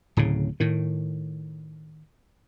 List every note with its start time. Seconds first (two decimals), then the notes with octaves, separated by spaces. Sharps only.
0.17 D1 A2 C#3
0.60 A2 D#3